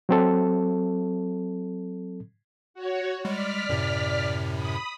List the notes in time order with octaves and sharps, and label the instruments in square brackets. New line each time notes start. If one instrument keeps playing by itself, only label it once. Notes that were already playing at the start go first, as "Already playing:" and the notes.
[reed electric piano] F#3 C4 A4
[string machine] F#4 C#5
[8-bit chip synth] G3 G#3 [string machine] D5 F6 B6
[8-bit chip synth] F#2 A2 C3
[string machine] B5 D#6